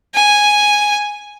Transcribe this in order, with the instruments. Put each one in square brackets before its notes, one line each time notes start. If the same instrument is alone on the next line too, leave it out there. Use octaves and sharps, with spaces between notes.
[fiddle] G#5